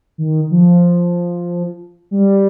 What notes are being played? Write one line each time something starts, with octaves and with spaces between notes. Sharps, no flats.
D#3
F3
G3